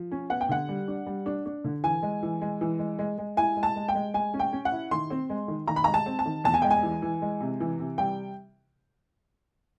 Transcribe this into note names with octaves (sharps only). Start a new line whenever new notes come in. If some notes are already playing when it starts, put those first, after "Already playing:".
Already playing: F3
C#4
B3 F#5
G5
D3 F#5
G3
D4
G3
D4
D4
D3
E3 G#5
G#3
E3
G#3
E3
G#3
G#3
G#3
E4 G#5
G#3
A5
G#3
G5
G#3
G#3 G#5
C#4
G5
C#4
F#5
E4
D#3 C6
C4
G#3
D#3
D#3 A#5
B5
G#3 A#5
A5
C4
A5
D#3
E2 A5
G#5
G#3 G5
G#5
E3
E3
G#3
C3
E3
C3
G3 G5